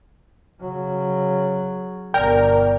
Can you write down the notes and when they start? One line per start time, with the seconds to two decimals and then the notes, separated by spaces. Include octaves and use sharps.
0.60 C#3 F#3
2.14 G1 B2 A#4 D5 G5